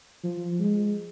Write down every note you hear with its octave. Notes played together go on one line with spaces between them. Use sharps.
F3
G#3